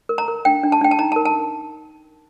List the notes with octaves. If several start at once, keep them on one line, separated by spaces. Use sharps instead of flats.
A#4
A#5
A#4
D4 G5
D4
A5
D4 G5
A5
D#4 A#5
A#4 A5
A5